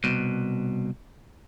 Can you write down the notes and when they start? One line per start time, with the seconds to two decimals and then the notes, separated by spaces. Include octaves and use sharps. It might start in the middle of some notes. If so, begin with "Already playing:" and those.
0.04 C2 B2